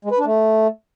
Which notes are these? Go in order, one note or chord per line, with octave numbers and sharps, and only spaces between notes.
G#3
B4
D4
A3